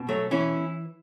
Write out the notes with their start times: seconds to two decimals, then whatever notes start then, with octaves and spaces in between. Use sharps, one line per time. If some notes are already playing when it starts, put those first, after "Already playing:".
Already playing: B2
0.09 F#3 A3
0.31 E3 C#4 E4